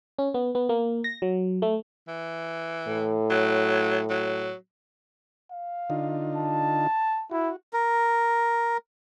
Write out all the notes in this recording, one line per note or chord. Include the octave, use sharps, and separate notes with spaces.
C#4
B3
B3
A#3
A#6
F#3
A3
E3
A2
F#3
F#3
F5
D3 D#4 F4
A5
E4 F#4
A#4